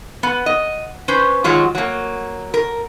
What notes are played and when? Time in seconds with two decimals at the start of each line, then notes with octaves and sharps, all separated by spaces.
0.23 B3
0.46 D#5
1.08 C#4 B4 C5
1.44 D#3 F#3 G#3 F4
1.75 F#3 A#3
2.54 A#4